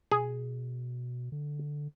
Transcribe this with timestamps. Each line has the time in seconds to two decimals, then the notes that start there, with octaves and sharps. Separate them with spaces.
0.12 B2 G#4
1.32 D3